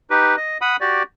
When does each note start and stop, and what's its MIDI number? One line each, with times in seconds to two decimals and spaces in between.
0.10 0.36 63
0.10 0.36 67
0.10 0.36 71
0.37 0.58 75
0.61 0.76 78
0.61 0.76 83
0.61 0.76 87
0.81 1.03 66
0.81 1.03 67
0.81 1.03 74